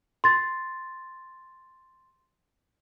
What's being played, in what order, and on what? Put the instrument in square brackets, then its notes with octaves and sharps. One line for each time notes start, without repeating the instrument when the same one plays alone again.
[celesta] C6 A6